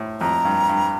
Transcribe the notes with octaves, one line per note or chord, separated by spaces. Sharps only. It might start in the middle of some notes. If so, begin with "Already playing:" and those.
Already playing: A2
F2 A#5
G2
G2